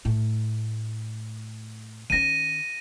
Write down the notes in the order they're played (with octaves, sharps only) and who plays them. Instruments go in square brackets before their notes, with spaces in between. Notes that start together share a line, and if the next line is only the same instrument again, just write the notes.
[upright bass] A2 A3
[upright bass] D#3 C#4 [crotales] A#6 D#7